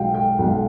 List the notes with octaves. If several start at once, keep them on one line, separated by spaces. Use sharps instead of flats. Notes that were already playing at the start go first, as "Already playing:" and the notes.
Already playing: B1 B2 G#3 F5 G5
G5
B1 B2 G#3